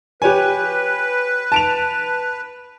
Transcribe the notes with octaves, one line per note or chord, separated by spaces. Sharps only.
G4 B4 C#5 G#5
A5 D7 F7